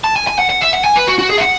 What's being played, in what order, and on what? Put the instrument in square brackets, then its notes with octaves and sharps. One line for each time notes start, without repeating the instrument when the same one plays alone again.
[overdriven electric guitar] A5
G#5
G#5
F#5
F#5
E5
F#5
G#5
B4
F#4
F#4
G#4
E5
F#5